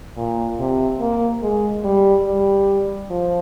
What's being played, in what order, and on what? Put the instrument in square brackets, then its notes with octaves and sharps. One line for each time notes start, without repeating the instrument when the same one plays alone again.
[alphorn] A#2
C3
A#3
G#3
G3
G3
F3